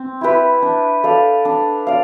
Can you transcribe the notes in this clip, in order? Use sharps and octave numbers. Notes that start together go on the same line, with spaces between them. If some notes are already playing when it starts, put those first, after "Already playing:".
Already playing: C4
E4 G4 B4
D4
A4 D5 F5
D4
D5 F5